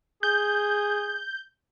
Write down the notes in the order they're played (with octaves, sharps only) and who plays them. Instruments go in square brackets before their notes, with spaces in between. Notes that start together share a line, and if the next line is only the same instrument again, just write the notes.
[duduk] G#4 [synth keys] G6